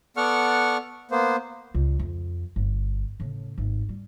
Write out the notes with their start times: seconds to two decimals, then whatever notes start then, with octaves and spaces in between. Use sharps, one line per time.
0.17 B3 A4 D5 F#5 C#6 F6
1.11 A#3 B3 C5
1.74 C#2
1.99 F2
2.56 G1
3.20 A2 C#3
3.58 G#1 A2
3.89 G3